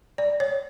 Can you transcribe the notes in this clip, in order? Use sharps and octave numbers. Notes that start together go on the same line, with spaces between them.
D5
C#5